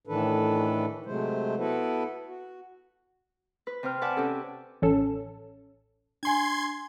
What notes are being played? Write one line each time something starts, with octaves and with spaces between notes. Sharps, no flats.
A2 D#3 E3 D4 A4 B4
C3 F#3 G#3 A3 C5
B3 E4 F#4 A4 B4
F#4
B4
C3 C5 G5 F6
B4 D5 F#5 G#5 A5 D6
C3 C#4 G4 A4
A1 C#4 A4
D4 G#5 C6 G#6